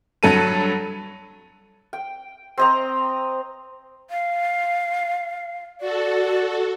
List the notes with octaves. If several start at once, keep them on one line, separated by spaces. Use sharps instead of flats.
G2 F#3 A4 D#7
G5
C4 D#5 A#5
F5
F#4 A4 D5